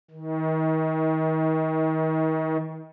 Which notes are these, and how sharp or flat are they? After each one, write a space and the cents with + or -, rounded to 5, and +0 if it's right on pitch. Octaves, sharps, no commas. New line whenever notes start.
D#3 +30